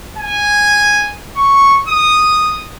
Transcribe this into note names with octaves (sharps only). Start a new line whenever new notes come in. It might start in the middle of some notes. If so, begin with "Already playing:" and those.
G#5
C#6
D#6